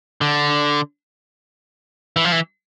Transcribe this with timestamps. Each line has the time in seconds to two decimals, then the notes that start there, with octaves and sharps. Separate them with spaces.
0.21 D3
2.16 E3
2.25 F3
2.32 E3